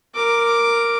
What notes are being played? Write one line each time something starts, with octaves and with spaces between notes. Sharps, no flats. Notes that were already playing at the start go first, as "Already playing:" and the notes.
A#4 D6